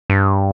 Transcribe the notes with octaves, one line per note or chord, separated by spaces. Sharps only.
G2